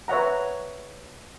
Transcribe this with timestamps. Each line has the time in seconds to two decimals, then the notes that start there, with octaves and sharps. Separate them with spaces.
0.08 B4 C#5 E5 F#5 A#5